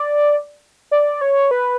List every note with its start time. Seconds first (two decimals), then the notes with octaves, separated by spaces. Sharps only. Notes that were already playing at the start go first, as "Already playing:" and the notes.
Already playing: D5
0.91 D5
1.21 C#5
1.51 B4